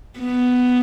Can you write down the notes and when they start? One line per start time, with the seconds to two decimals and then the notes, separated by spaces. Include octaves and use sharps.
0.19 B3